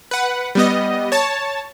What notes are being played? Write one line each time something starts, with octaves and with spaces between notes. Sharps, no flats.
B4 F#5
G3 B3 D#5
C#5 A5